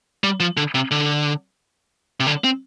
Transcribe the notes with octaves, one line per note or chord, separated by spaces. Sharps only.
G3
F3
D3
C3
D3
C3
D3
C4